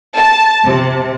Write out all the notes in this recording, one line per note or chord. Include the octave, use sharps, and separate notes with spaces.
A5
C3